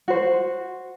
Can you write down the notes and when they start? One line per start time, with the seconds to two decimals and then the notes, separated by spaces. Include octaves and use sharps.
0.08 F#4 C5